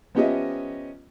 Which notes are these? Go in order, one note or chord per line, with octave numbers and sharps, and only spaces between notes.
F3 B3 C#4 G4 D#5 E5